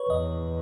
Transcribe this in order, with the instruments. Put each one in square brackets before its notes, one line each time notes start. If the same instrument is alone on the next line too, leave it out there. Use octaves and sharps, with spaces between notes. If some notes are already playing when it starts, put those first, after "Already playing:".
Already playing: [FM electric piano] B4 C#5
[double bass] E2 [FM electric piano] D#5